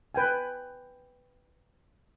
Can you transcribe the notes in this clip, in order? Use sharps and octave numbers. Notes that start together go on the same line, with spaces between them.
B4 G5 G#5